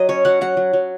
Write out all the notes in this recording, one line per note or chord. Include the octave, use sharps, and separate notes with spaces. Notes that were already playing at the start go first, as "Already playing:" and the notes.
Already playing: F#3 D#5
C#4 C#5
F#3 F#5
F#3 F#5
F#3
F#3